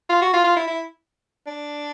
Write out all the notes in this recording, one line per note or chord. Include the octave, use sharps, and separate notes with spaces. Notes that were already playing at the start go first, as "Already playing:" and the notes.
F4
F#4
F4
F4
E4
E4
D4